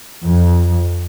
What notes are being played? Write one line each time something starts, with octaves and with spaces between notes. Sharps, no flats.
F2